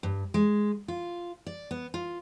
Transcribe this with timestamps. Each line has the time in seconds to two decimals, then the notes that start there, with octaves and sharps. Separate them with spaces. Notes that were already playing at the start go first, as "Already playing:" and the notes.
0.03 G2
0.34 G#3
0.88 F4
1.46 D5
1.71 B3
1.94 F4